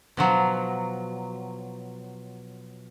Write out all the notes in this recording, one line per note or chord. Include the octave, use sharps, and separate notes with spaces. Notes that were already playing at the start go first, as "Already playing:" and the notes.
B2 F3 F#3